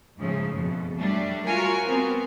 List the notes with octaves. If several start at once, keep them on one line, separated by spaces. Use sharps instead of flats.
G#2 C#3 F3 A3
F2 B2
F#3 G3 A3 D4
F4 F#4 A#4 C#5 G#5
B3 C4 A#4